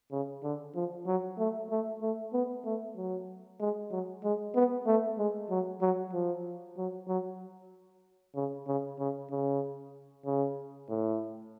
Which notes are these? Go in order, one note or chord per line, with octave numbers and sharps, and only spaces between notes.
C#3
D3
F3
F#3
A3
A3
A3
B3
A3
F#3
G#3
F#3
G#3
B3
A3
G#3
F#3
F#3
F3
F#3
F#3
C#3
C#3
C#3
C#3
C#3
A2